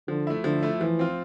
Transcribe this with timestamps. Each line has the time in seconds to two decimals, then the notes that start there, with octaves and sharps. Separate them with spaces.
0.08 D3 F3
0.27 A3 E4
0.44 D3 F3
0.63 A3 E4
0.81 E3 F3
0.99 C4 F4